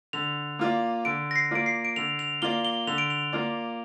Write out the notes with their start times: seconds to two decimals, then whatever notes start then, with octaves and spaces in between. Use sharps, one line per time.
0.13 D3 F7
0.59 A#3 F4 D5
1.05 D3 D7
1.31 A#6
1.36 C7
1.51 A#3 F4 D5 D7
1.66 C7
1.85 D7
1.96 D3 F7
2.19 F7
2.42 A#3 F4 D5 G7
2.65 G7
2.87 D3 F7
2.98 D7
3.10 F7
3.33 A#3 F4 D5